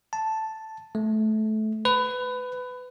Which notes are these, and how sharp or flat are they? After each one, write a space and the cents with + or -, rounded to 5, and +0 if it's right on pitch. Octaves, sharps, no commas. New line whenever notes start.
A5 +0
A3 -20
B4 +20